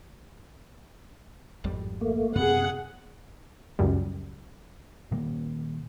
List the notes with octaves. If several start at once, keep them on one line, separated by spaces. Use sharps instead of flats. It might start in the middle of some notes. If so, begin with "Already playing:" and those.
G#1 F2 G3
A3 A#3
F#2 C3 B3 G#4 F#5
C#2 F#2 G3
A#2 D#3 G3 A#3